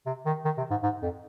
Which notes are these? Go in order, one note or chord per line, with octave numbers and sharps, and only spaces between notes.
C3
D#3
D#3
C3
G#2
G#2
F2